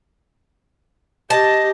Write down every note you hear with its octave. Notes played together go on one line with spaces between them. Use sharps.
G4 D#5 A5